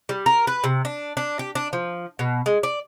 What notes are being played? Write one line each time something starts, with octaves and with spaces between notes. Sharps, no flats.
G3
A#4
B4
C3
D4
D4
G4
D4
F3
B2
G#3
D5